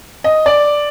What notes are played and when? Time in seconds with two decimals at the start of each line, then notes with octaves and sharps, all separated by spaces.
0.24 D#5
0.46 D5